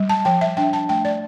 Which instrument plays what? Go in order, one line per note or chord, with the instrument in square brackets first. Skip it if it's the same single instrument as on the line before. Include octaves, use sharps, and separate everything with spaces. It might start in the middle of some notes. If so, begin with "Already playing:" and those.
Already playing: [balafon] G3
A5
F3 G5
E5
D4 G5
A5
A3 G5
D5